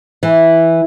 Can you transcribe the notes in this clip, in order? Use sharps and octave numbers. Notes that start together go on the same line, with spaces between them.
E3